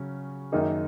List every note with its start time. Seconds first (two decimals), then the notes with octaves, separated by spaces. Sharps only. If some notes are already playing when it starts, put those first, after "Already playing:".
Already playing: C#3 F#3 C#4
0.52 F#2 D#3 A#3 D#4 G#4